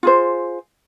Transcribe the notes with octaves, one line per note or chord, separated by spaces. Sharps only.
F4 G#4 C5